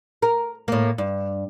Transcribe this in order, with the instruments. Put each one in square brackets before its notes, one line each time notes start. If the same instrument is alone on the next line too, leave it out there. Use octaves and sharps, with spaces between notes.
[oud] A#4
A2 A#3
G2